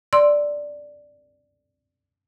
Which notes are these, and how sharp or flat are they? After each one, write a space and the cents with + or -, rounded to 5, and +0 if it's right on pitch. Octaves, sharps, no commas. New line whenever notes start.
D5 +0 C6 +0 E6 +0